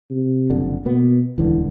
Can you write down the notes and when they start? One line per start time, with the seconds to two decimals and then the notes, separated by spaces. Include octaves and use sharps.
0.11 C3
0.50 F#1 F2 D3
0.86 B2 A#3 B3
1.38 D#1 C#2 D3 E3